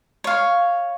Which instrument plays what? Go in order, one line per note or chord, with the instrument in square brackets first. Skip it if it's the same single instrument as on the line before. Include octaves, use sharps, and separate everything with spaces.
[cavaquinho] C#5 F5